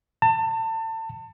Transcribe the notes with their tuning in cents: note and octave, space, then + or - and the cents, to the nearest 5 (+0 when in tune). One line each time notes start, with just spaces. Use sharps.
A5 +30